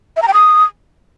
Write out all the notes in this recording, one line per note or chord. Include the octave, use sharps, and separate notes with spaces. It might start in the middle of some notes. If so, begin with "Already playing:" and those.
E5
A#5
G5
D#6